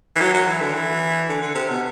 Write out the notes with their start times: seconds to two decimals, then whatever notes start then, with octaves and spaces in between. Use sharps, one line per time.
0.15 E3
0.20 F#3
0.34 F#3
0.47 E3
0.60 D3
0.74 E3
1.29 D3
1.42 D3
1.55 C3
1.69 B2